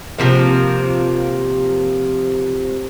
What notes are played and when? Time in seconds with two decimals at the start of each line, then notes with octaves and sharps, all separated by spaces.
0.18 C3 F3 A#3